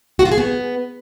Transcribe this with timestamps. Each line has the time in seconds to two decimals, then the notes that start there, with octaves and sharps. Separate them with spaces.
0.19 F#4
0.25 F4
0.32 G#4
0.38 B3